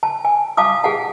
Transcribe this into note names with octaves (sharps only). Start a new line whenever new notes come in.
A5
G#5
F5 A5 D6 D#6
G#4 F5 F#5 A5